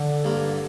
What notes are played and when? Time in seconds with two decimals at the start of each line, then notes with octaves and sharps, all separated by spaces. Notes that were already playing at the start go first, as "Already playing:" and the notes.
Already playing: D3
0.24 G2 A#3